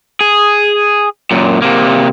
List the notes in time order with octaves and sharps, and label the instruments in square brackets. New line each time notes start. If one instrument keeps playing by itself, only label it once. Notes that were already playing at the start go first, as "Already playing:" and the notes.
[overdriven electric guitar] G#4
F#2 A#2
C3 A#3